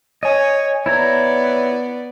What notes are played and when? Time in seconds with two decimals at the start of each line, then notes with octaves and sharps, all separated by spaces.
0.23 C#5 D#5 G#5
0.86 B3 E4 C#5 D5 A#5